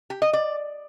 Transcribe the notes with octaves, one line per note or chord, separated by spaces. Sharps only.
G4
D#5
D5